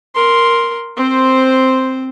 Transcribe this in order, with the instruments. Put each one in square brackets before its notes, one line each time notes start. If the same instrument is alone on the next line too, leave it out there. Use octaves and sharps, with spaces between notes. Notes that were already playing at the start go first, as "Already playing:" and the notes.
[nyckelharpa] A#4 C6
C4 C5